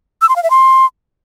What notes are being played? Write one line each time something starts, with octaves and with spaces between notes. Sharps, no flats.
E6
C6
F5
E5
C6